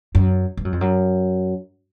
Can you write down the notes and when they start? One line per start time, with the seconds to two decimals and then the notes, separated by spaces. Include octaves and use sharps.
0.15 F#2
0.57 G2
0.65 F#2
0.72 F2
0.81 F#2